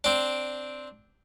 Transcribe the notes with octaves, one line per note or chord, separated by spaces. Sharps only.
C4 D4